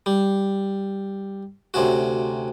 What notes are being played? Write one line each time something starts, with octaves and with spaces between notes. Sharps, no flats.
G3
D2 C3 C#4 F#4